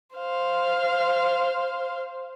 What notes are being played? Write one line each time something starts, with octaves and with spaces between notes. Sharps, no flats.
C5 F5